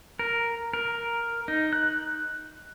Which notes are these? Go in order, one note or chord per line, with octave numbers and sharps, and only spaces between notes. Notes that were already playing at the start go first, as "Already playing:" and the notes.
A#4
A#4
D#4
F#6